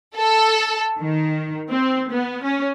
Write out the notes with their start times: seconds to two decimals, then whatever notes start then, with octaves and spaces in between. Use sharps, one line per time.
0.17 A4
0.99 D#3
1.69 C4
2.09 B3
2.43 C#4